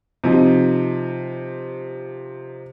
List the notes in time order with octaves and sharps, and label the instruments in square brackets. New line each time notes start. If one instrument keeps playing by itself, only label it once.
[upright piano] C3 F3 D#4